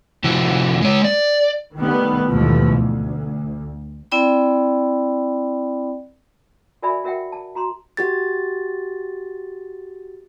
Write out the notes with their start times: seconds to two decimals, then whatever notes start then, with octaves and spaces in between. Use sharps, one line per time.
0.24 C3 F3 E4 F#4
0.81 G#3 C#5
1.04 D5
1.77 D#3 G3 A3 B3
2.28 D#2 G#2 B2 E3 F3 A3
2.75 D2
4.11 C4 E4 D5 G5 B5
6.82 F#4 A#4 D5 E5 G#5 B5
7.04 F#4 A#4 E5 F#5 G5
7.32 A5
7.55 F#4 A#5 C6
7.97 F#4 G4 A6